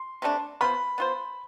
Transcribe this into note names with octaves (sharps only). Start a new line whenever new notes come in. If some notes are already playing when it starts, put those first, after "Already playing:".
Already playing: C6
C3 E3 A3 D4
B3 F4 C5 B5
B3 F4 C5